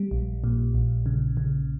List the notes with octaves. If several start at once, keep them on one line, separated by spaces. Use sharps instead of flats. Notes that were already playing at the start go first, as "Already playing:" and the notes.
Already playing: G3
A#1
A#2
A#1
C#3
C#3